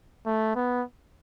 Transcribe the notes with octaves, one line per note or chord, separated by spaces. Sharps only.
A3
B3